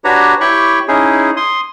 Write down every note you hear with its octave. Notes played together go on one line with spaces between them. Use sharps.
D4 F#4 G4 B4 C#5 A#5
E4 G4 C#5 G5 B5 C#6
C#4 D#4 E4 G#4
C6 D#6